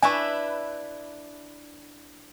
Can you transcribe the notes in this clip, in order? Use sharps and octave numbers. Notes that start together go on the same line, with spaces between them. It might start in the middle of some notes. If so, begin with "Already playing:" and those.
D4 E4 B4 G#5 C#6